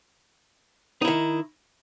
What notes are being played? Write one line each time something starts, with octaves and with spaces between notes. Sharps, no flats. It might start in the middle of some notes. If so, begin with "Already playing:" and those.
D#3 D#4 E4